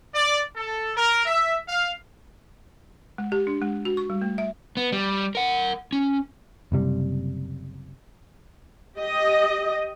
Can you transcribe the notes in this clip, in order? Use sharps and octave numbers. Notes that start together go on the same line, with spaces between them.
D5
A4
A#4
E5
F5
G#3
G4
D4
G#3
F#4
C#6
G3
A3
E5
B3
G3
A#4 F#5
C#4
F#1 C3 G3
G4 D#5